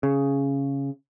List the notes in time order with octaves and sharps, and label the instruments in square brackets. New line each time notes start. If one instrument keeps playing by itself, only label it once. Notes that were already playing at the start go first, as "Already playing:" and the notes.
[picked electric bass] C#3